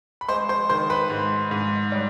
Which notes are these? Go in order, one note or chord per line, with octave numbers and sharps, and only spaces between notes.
B5
G#3 C5 C6
C5 C6
D#3 C5 C6
B4 B5
G#2
G#2
G3